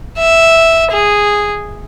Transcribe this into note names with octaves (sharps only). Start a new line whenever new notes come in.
E5
G#4